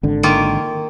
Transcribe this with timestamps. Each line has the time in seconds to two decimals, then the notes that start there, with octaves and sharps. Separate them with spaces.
0.03 G#1 D3
0.23 D#3 A#3 F4